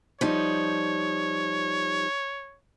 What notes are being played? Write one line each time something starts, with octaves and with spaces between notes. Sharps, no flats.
F3 G3 D#4 C#5